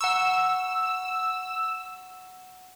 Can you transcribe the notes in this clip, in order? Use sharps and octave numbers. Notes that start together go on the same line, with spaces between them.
F#5 A#5 C#6 E6